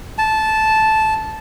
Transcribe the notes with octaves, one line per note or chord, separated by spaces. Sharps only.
A5